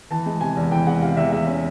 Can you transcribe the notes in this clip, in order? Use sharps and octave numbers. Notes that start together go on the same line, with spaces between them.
E3 A5
G#3
C3 G#5
E2
E3 G5
G#3 F#5
C3 F5
E2 E5
G#3 E5
C#4